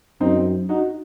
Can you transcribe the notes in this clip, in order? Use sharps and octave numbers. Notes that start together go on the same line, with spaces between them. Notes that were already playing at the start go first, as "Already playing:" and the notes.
F#2 C4 D#4
D#4 F#4